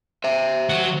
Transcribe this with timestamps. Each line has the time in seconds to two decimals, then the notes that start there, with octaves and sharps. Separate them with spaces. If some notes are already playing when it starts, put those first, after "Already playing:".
0.24 C5 E5
0.69 F#3 F#4